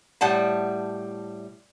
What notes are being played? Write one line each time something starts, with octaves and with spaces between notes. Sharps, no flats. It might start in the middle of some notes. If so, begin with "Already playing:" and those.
A2 G3 F#5 A5